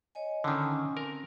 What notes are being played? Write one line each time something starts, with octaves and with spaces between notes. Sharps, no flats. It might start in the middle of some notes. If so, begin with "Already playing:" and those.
C#5 D#5 G#5
D3 D#3 C#4 G#5
C4 A#4